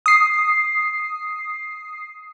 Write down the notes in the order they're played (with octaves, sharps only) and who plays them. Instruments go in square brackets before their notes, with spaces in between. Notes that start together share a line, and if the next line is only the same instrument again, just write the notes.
[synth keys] D#6 C7